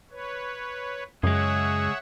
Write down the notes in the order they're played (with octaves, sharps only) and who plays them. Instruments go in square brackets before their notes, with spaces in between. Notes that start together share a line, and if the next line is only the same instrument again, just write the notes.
[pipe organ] B4 C#5
[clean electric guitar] C#2 G#3 [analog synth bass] F#2 [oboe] G#4 [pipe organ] C#5 E5 F#5